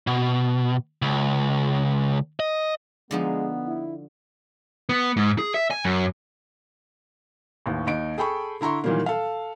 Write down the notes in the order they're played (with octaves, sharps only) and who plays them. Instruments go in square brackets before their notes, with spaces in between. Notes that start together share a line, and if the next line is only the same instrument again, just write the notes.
[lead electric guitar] B2
C#2
D#5
[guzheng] D3 F3 D#4 [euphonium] G#3 [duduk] B3
[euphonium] E4
[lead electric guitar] B3
G#2
G#4
E5
G#5
F#2
[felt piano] A1 D#2
D#2 D#4 D7
G#4 A4 G5 B5 C#6
D3 E4 A#5 C6 C#6
A#2 D#3 E3 F#3 G3 A#3
A4 F5